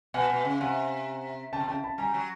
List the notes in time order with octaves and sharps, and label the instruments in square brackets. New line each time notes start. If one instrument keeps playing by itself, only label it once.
[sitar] B2 [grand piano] F#5 G#5
[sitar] B2
C#3
[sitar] C3 [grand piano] F#5 G#5
[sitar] C#3 [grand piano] G5 A5
[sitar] C3
[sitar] C#3 [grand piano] G5 A5
[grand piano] A5 B5
[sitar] G3 [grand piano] G#5 A#5
[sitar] F#3